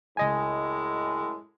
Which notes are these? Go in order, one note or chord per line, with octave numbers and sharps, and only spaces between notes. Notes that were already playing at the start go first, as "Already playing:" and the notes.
C#2 F#2 A2 G#3 D#5 G#5